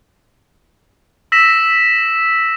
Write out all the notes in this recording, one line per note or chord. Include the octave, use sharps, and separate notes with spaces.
E6 A#6 B6 E7